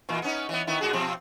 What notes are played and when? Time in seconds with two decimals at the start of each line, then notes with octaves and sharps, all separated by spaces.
0.09 A#2 E3 A#3
0.22 B3 C#4 D#4
0.49 E3 B3
0.67 D#3 B3 E4
0.81 A2 F#4 G#4
0.93 B2 F3 C4